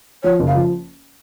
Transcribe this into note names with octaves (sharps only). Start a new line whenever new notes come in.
F3 C#5
F#1
F5
F3